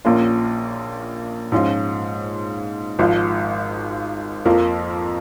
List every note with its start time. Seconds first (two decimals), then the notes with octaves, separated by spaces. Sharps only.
0.05 A#1 A#2 A#3 C#4 F4
1.52 G#2 F3 C#4 F4
2.99 G#1 G#2 F3
4.45 F2 F3 A#3